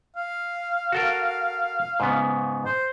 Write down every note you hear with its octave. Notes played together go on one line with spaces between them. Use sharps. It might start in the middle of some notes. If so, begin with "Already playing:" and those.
F5
F#4 A4 A#4
G#2 C#3 B3
C5